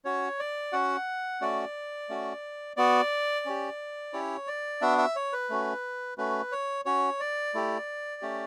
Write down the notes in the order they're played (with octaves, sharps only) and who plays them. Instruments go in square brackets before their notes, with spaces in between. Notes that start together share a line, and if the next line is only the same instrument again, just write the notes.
[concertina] C#4 F#4 C#5
D5
C#4 F#4 F#5
A3 C#4 F#4 D5
A3 C#4 F#4
B3 F#4 D5
C#4 G4
C#4 E4 G4 C#5
D5
B3 D4 F#4 E5
E5
C#5
B4
A3 C#4 F#4
A3 C#4 F#4 B4
C#5
C#4 F#4 C#5
D5
A3 E4 G4
A3 C#4 G4